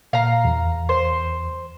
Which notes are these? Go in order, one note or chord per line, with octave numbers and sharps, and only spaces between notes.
A#2 F5 A#5
E2
C5